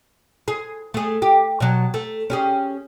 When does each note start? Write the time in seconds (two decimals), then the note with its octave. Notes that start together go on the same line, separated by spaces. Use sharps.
0.48 G#4
0.94 A3 G#4
1.22 G4
1.60 B2 F#3
1.94 A3
2.30 C#4 G4 G#4